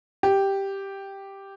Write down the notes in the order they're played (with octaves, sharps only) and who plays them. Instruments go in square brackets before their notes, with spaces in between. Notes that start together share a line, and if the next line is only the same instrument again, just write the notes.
[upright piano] G4